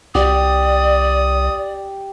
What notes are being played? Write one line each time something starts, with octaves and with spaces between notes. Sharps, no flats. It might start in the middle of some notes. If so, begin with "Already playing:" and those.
C2 G4 D5 D#6